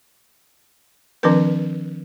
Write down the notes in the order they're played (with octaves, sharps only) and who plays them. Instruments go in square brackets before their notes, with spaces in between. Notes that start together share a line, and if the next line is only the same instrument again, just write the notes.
[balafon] D#3 F3 C4 D4 A#4 B4